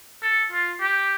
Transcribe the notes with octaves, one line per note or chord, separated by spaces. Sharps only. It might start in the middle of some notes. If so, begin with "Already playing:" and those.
A4
F4
G4